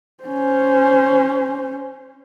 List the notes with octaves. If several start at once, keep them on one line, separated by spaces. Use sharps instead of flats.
C#4 C5